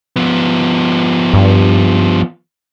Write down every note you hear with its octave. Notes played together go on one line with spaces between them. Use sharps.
F3 B3
G2